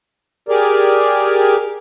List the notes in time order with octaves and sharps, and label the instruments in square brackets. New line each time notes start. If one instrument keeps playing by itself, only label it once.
[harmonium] G4 G#4 A#4 D5